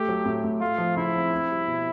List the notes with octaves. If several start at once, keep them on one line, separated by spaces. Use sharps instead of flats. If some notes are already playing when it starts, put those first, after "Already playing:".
Already playing: A3 G4
F#3
A2
A2
A3 F4
F3
C#3 E4
C4
C4
G3
B2